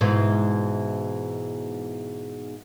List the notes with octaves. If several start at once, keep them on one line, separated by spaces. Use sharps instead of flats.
G#2 B2 E3